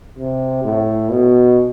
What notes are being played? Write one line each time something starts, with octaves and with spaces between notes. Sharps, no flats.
C3
A2
B2